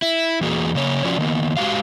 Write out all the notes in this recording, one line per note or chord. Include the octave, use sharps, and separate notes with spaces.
E4
E2 E3 A#3 F#4 G#4
C#3 A#3 C#5
F3 C#4 F4 F#4 D5
D#3 A#3 B3
G#3 F#4 G4 F5